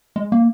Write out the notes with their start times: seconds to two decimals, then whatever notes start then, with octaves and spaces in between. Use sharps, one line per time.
0.16 G#3
0.32 A#3